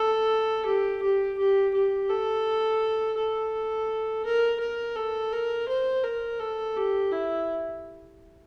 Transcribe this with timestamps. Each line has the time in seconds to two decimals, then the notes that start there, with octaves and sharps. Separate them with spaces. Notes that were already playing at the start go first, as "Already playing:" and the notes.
Already playing: A4
0.65 G4
1.02 G4
1.38 G4
1.74 G4
2.09 A4
3.17 A4
4.25 A#4
4.60 A#4
4.96 A4
5.33 A#4
5.68 C5
6.04 A#4
6.40 A4
6.76 G4
7.11 E4